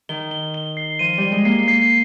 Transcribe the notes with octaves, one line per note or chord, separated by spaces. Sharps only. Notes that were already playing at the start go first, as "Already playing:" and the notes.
D#3 G7
G7
G7
C7
F3 D#7
G3 G7
G#3
A#3 C7
C7